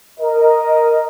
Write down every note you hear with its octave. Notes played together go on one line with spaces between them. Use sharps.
A#4 D#5